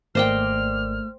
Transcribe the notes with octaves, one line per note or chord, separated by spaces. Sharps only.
G#1 A3 A#3 C5 D5 D#5 G5 F6